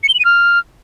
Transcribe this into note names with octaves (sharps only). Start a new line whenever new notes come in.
C#7
G7
F#7
D#7
F6